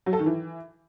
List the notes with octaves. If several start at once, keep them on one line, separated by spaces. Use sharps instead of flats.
F#3
A4
D#3
E3